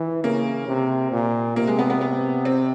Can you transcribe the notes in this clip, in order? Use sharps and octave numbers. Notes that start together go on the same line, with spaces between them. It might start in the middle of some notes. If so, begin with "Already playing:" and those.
Already playing: E3
C#3 A#3
C3
A#2
C3 A#3
G#3
B3
B3
B3
C4